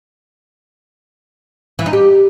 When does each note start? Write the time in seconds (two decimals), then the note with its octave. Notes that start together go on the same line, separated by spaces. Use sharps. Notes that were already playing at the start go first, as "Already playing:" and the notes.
1.79 E3
1.86 D#4
1.93 G4